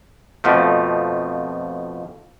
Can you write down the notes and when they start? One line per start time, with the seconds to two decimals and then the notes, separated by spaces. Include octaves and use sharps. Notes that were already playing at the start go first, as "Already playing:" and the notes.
0.44 F2 B2 F3 A3